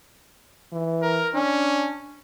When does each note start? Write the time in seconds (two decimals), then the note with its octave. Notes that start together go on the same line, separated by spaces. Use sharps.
0.73 E3
1.02 A#4
1.34 C#4 D4